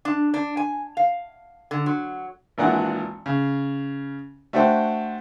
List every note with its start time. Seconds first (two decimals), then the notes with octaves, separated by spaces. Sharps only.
0.05 D4
0.34 D4
0.57 G#5
0.97 F5
1.71 D3
1.86 F#3
2.58 G#1 A#2 E3 D4 A#4 F#5
3.26 C#3
4.53 A3 D4 F#4 A4 C5 G5